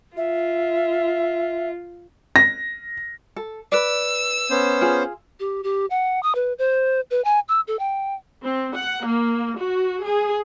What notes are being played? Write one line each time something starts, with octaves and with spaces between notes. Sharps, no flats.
F4 E5
A#6
A4
B4 D5 E6
B3 C#4 C5
F4 G#4
G4
G4
F#5
D#6
B4
C5
B4
G#5
E6
A4
G5
C4
F#5
A#3
F#4
G#4